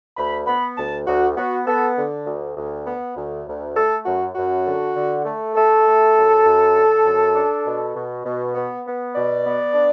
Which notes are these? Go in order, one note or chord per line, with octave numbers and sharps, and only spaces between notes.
D2 B5
B3 B5
D2 A5
D2 F#4
B3 F#4
B3 A4
D3
D2
D2
B3
D2
D2
A3 A4
F#2 F#4
F#2 F#4
D3
D3
A3
A3 A4
A3
F#2
F#2
D3
F#2
D4
B2
B2
B2
B3
B3
B2 D5
B3
D4